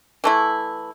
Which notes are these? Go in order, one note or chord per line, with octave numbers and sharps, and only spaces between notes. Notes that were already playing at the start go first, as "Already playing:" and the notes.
E3 A3 E4